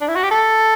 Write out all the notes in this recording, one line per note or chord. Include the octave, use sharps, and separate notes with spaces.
D4
E4
F#4
G4
A4